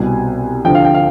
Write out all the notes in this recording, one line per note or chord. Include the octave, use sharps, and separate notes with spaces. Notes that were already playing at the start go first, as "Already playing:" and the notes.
Already playing: C2 B2 G3 C4 G#5
D2 D3 F3 G5
F5
G5
F5